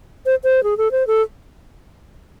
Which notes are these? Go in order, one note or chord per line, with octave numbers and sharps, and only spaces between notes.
C5
C5
G#4
A4
C5
A4